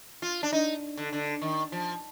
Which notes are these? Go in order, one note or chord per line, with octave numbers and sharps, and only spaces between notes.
F4
D4
D#4
D3
D3
D#3
F3